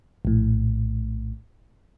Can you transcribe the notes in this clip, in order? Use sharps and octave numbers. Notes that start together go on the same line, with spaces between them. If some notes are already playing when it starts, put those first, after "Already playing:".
A#1 A2